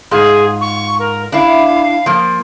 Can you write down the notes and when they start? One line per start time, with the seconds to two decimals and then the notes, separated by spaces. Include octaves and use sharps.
0.11 G#2 F4 G#4
0.61 C#6
0.99 A#4
1.32 D4 E4 F5
2.06 F3 A#3